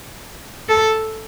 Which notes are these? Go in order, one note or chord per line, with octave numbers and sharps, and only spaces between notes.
A4